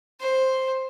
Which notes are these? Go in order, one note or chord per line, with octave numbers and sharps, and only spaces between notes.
C5